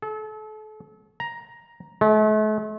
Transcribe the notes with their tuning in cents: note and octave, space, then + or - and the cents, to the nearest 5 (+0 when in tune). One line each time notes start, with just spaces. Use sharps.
A4 -35
A#5 +10
A3 -40